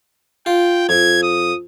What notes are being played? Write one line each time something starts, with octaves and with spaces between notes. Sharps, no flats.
F4 G5
F2 G#6
D#6